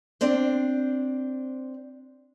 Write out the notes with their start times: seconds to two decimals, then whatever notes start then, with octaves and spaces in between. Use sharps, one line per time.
0.21 C4 D4 C5